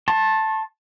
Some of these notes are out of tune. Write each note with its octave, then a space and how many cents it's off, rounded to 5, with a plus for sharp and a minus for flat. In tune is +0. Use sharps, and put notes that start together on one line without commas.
A5 +0 C6 +45